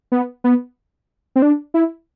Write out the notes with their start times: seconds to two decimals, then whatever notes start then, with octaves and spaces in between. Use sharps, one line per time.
0.12 B3
0.44 B3
1.36 C4
1.42 D4
1.74 E4